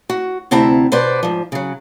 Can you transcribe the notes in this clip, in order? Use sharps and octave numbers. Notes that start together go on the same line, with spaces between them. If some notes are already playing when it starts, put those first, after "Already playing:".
F#4
D2 C3 C4 E4 A5 A#5
B2 B4 C5 D5
G#2 F3
C#3 F#3